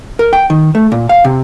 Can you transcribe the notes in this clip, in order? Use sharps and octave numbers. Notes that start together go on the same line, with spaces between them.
A#4
G5
D#3
A3
A#2
F5
C3